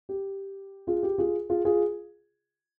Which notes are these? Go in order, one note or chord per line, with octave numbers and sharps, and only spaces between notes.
G4
F4 G#4
G4
F4 G#4
F4 G#4
F4 G#4